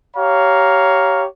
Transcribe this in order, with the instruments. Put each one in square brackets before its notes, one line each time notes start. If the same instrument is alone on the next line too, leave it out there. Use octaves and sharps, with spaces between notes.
[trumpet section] G4 C#5 F5 A#5